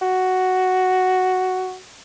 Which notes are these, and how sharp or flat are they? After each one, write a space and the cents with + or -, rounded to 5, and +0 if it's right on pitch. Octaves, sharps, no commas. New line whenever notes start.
F#4 +5